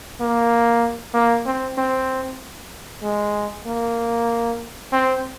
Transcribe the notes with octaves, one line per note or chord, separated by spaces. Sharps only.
A#3
A#3
C4
C4
G#3
A#3
C4